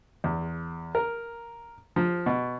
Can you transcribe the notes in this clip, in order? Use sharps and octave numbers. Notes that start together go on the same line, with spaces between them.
E2
A#4
F3
B2